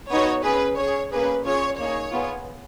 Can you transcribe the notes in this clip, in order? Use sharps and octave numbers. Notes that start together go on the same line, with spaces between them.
B3 D#4 F#4 C#5
C#4 G#4 B4
C#4 G#4 C#5
A#3 C#4 G#4 B4
C#4 F4 G#4 C#5
A#3 D#4 G#4 C#5
B3 F4 G#4